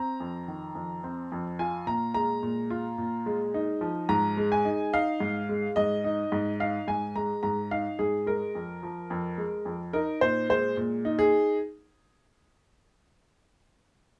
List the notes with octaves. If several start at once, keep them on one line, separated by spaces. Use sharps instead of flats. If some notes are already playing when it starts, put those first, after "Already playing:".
Already playing: C4 A#5
F2
D#3
F2
C4
F2
F4 G#5
A#2 A#5
G#3 A#5
A#2
F4
A#2
G#3
D#4
F3
G#2 A#5
G#3
G#5
D#4
D#4 F5
G#2
G#3
G#2 D#5
D#4
G#2
D#4 F5
G#2 G#5
G#3 A#5
G#2 A#5
D#4 F5
G#2 G#4
G#3 A#4
F2
F3
F2
G#3
F2
D#4 A#4
A#2 C5
G#3 C5
A#2
D#4
G#4